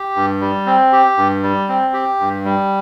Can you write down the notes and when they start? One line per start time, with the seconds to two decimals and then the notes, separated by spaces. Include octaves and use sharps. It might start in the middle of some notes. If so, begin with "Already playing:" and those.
Already playing: G4
0.16 G2
0.41 G3
0.66 C4
0.92 G4
1.17 G2
1.43 G3
1.69 C4
1.94 G4
2.20 G2
2.45 G3